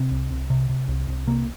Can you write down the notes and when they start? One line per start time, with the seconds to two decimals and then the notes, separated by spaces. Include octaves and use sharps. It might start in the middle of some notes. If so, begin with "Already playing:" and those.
Already playing: C3 C4
0.11 C2
0.30 C2
0.50 C3
0.69 C3
0.88 C2
1.08 C2
1.27 C3 A#3